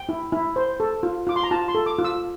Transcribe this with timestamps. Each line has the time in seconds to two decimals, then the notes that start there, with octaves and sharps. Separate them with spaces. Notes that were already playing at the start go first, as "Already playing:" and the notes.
Already playing: G5
0.09 E4
0.32 E4
0.56 C5
0.80 A4
1.03 F4
1.27 F4 D6
1.36 C6
1.43 A#5
1.51 F4 A5
1.68 C6
1.75 A4
1.86 D6
1.98 F4
2.04 E6